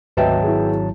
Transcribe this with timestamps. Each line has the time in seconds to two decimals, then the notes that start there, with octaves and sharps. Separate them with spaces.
0.17 G#1 D2 F#3 B4 D#5 E5 G5 A5
0.44 E4 G#4